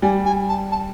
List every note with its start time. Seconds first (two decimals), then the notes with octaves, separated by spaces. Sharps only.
0.02 G3 G#5
0.25 G#5
0.48 A5
0.71 A5